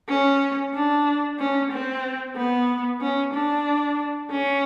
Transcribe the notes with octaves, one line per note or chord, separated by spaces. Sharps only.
C#4
D4
C#4
C4
B3
C#4
D4
C#4